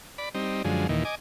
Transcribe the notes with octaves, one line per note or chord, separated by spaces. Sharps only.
D5 B5
G3 C4 D#4
F#2 D3 F3 G#3
D#2 A#2 D#3 E3
D#5 G#5 D6